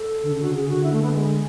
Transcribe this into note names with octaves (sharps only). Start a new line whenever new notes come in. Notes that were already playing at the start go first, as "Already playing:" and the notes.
Already playing: A4
D3
C#3
D3 F#4
C#3 G#4
D3 F#4
D3 E4
A3
B3
G#3